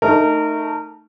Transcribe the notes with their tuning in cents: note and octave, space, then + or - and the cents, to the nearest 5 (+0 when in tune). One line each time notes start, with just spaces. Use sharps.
A3 +0 D#4 -15 A#4 -25